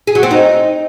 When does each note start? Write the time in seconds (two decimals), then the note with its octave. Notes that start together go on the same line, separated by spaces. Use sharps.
0.07 G#4
0.15 F#3
0.23 C4
0.31 D#4